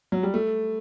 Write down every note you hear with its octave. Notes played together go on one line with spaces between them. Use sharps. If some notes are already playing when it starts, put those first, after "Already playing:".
F#3
G3
A3